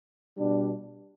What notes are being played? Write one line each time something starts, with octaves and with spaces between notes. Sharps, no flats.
B2 G3 D4